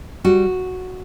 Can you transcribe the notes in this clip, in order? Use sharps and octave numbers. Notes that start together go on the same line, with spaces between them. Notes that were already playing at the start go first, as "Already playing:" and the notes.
G3 F#4